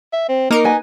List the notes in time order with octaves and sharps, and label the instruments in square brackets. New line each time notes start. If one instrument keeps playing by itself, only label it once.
[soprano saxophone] E5
C4
[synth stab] A#3 A#4 [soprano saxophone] D#4
[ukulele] B4 G#5